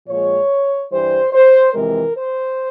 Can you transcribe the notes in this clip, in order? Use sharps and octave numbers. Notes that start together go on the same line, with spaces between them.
A#2 F3 G#3 C#5
G2 E3 G3 C5
C5
F2 C3 E3 G#3 A#4
C5